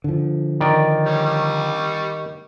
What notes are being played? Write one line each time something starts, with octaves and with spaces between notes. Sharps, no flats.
D3 F3
D#3 D5
G3 C#5
G3 C#6